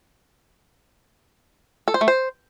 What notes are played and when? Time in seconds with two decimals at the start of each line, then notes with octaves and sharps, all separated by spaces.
1.88 A4
1.94 C5
2.01 A3
2.08 C5